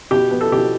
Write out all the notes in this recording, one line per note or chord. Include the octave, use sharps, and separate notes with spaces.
B2 G4
B3
A4
B2 G4